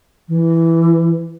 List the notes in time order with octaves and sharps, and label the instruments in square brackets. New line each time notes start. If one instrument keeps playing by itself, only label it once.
[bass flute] E3